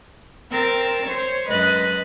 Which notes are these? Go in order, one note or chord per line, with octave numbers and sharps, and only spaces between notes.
C4 A#4 E6 A6
C5 C#5
F#2 G#3 B4 D#5 F#6 A6